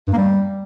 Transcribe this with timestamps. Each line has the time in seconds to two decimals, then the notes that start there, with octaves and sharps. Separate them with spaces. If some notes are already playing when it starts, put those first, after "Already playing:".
0.07 G2
0.12 A#3
0.17 G3